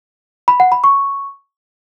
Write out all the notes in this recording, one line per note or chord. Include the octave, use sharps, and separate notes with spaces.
B5
F#5
B5
C#6